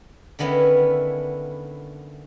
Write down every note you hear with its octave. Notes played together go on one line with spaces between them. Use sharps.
D3 D#3 B3 C#4 E4